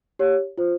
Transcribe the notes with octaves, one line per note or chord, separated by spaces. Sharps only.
G4 C#5
F4 C5